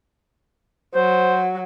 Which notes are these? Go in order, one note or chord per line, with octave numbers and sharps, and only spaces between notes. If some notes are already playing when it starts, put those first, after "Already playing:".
F#3 C5